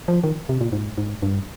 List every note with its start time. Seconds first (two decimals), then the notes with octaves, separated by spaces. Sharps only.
0.08 F3
0.24 D#3
0.49 C3
0.61 A#2
0.72 G#2
0.98 G#2
1.22 G2